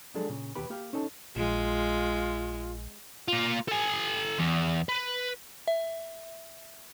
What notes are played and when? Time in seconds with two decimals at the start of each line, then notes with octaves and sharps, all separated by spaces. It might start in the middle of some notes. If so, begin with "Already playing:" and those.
0.14 F3 F#3 G#3 D4 G#4 A4
0.29 A#2 C#3
0.55 D#2 B2 G4 B4 B5
0.70 A#3 G4 F5
0.93 C#4 D#4 A4 A5
1.36 A#1 G#3 F4
3.28 A#3 F4
3.68 A4 G#5
4.39 E2
4.89 B4
5.68 E5